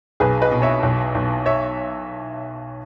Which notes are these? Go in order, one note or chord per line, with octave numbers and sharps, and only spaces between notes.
B1 G#4 B4
B4 D#5
B2
C#5 E5
B1
B1
C#5 E5